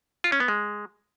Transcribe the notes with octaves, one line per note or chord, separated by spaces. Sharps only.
F4
C#4
B3
G#3